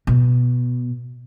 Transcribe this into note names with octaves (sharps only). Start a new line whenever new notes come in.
B2